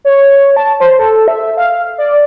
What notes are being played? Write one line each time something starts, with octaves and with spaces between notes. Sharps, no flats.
C#5
A5
C5
A4
E5
F5
D5